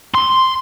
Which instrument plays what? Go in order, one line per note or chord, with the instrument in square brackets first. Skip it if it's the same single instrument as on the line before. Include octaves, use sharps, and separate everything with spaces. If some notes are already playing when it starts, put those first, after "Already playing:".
[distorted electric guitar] C6